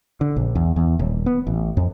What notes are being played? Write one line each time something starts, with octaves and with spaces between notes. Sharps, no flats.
D3
A#1
E2
E2
D#1
B3
A1
F2